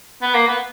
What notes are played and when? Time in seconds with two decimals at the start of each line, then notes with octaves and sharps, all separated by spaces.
0.22 B3
0.34 A#3
0.48 B3